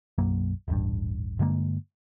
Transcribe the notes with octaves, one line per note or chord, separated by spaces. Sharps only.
B1 F#2 F#3 A#3
D#1 A1 G2
G2 D3 G#3 A#3